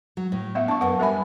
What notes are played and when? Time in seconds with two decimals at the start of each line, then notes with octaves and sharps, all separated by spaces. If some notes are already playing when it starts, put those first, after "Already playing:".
0.17 F#3
0.32 A2
0.55 B3 E5 F5
0.68 D4 A5 C#6
0.81 F#2 B3 F#5
0.99 G3 A#4 E5 G#5 B5